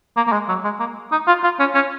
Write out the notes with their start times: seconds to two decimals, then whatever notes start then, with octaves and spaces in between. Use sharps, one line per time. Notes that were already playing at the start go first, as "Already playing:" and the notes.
0.17 A#3
0.28 A#3
0.33 G#3
0.49 F#3
0.64 G#3
0.80 A#3
1.12 D#4
1.28 F4
1.44 F4
1.60 C#4
1.75 C#4